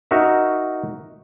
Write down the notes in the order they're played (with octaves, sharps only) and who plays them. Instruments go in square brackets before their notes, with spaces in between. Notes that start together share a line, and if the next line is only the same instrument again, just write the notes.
[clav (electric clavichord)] D#4 F#4 A#4 E5